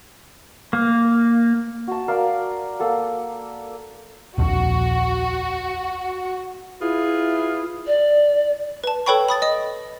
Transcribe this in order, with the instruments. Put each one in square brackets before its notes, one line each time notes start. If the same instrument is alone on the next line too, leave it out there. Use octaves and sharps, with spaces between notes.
[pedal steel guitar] A#3
[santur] F#4 A5
A#4 D5 F5
A#3 A4 F#5
[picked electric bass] D#1 A#1 F2 [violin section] F#4
[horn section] E4 F4 G#4 B4
[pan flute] D5
[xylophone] B4 A5
A4 B4 C#5 G5 B5 C#6
B5 D#6 A6
D#5 D#6